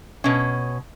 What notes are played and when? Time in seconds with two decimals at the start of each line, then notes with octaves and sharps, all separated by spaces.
0.24 B2 C#4